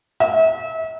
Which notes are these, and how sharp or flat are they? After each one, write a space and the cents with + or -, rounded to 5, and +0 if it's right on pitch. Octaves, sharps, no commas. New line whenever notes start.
E5 -35